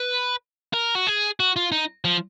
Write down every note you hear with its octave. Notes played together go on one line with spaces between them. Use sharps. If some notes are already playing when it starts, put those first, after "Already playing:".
Already playing: B4
A#4
F#4
G#4
F#4
F4
D#4
F3